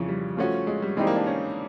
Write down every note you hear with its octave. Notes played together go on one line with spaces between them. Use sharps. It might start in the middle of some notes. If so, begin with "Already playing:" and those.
Already playing: F2 C#3 E3
G3
F3 A3 C#4 F#4
G#3
G3
E3 G3 G#3 C4 D#4 G4
A#3
D4
C#4